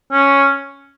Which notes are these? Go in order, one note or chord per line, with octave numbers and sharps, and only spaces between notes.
C#4